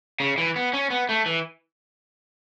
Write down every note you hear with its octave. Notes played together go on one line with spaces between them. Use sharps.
C#3
E3
B3
C#4
B3
A3
E3